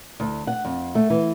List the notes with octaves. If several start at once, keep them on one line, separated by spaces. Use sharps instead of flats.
D2
F#5
F2
A3
E3